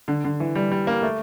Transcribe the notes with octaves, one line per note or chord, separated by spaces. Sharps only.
D3
D3
E3
G3
G3
A#3
A3